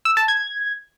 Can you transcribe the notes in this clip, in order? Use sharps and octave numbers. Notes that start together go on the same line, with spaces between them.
E6
A5
G#6